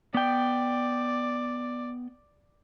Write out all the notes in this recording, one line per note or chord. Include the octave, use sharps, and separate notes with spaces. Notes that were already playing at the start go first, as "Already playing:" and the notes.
B3 D5 G5